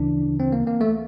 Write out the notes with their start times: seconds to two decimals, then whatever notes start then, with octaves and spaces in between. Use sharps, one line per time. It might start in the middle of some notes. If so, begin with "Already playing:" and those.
Already playing: D2 C#3 E3 D4
0.40 C4
0.52 A#3
0.67 A#3
0.81 A3